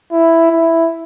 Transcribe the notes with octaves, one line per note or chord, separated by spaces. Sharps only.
E4
E4